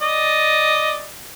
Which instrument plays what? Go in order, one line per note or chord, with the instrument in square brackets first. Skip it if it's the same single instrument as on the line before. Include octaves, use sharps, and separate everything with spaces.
[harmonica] D5 D#5